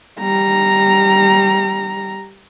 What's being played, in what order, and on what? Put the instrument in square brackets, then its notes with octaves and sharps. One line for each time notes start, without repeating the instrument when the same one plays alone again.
[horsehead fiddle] G3 A#5